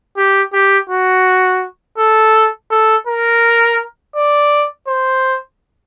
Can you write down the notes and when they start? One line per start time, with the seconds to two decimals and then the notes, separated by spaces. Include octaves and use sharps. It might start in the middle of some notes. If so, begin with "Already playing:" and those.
0.17 G4
0.53 G4
0.89 F#4
1.98 A4
2.71 A4
3.07 A#4
4.16 D5
4.88 C5